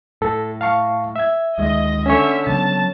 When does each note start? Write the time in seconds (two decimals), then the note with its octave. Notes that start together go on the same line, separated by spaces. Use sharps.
0.22 A2 A4
0.61 F5 A5 C#6
1.16 E5 G#6
1.58 D2 D#3 G#3 D#5
2.06 D3 C#4 C#5 E5
2.47 C#3 F#3 B3 A5